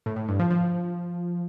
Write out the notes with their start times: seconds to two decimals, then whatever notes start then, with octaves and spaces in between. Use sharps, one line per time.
0.06 A2
0.16 A2
0.28 G2
0.39 F3
0.51 F3